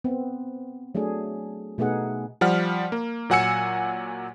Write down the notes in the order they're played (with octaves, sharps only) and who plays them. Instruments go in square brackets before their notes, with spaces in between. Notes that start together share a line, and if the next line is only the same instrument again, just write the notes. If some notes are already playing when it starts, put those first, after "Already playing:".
[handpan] B3 C4
F#3 A3 D4 G#4
B2 A3 B3 D#4 G#4 F#5
[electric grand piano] F3 G3 F#5 F6
A#3
A#2 F#3 F#5 G#5 E6 C#7